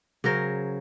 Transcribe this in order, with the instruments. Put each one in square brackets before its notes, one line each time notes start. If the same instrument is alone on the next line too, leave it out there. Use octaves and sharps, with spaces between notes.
[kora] C#3 F#3 A#4 C5